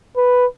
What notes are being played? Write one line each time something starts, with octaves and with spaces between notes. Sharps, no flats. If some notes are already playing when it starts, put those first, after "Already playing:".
B4